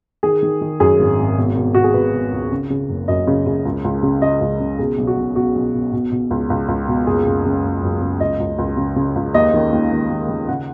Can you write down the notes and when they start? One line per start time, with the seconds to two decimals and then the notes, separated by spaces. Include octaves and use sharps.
0.23 D#3 G#4
0.43 D#3
0.61 D#3
0.80 F#2 G#4
0.99 G#1
1.18 G#1
1.37 B2
1.56 B2
1.75 B2 F#4
1.84 G#4
1.94 B2 B4
2.13 B2
2.32 C#2
2.51 C#3
2.70 C#3
2.89 F#1
3.08 F#2 D#5
3.27 C#3
3.46 C#3
3.65 C#2
3.84 C#2
4.03 C#3
4.22 C#3 D#5
4.41 C#2
4.60 C#3
4.79 B2 G#4
4.98 B1
5.07 F#4
5.17 B1
5.36 B2 F#4
5.55 B1
5.74 B2
5.93 B2
6.12 B2
6.31 C#2
6.50 C#2
6.68 C#2
6.88 B2
7.07 F#1 G#4
7.26 F#1
7.45 C#3
7.64 F#1
7.83 F#2
8.02 C#3
8.20 C#2 D#5
8.40 C#2
8.58 C#2
8.77 C#3
8.96 C#3
9.16 C#2
9.34 D#2 D#5
9.54 D#3
9.73 D#2
9.91 D#2
10.10 D#2
10.29 D#3
10.48 C#3 F#5